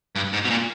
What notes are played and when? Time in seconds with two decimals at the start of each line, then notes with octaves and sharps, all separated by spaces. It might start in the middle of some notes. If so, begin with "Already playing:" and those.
0.15 G2
0.33 G#2
0.45 B2
0.50 A#2